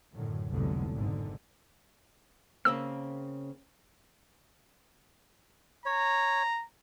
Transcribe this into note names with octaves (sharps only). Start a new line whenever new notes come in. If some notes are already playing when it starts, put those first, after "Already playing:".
F#2 A2 D3 D#3 F#3
F1 C2 G#2 B2 D3 F#3
G#1 G#2 D3
C#3 A#3 C4 E6
C#5 A#5